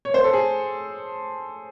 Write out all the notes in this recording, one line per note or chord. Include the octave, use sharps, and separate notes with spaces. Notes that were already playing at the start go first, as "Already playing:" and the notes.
C#5
C5
A4
G#4